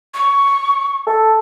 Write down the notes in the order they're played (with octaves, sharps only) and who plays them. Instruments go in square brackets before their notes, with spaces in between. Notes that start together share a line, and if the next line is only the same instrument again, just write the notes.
[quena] C#6
[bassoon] A4